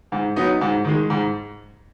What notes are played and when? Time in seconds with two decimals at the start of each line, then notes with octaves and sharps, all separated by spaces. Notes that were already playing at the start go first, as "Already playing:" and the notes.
0.12 G#2
0.36 F#3 B3 D#4
0.61 G#2
0.84 D#3 G#3
1.10 G#2